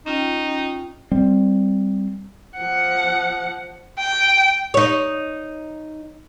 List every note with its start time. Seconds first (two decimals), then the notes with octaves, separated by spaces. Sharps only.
0.06 C#4 D#4 F4 G5
1.11 G3 C4
2.59 F3 F#5
3.99 G5
4.74 D#4 C#5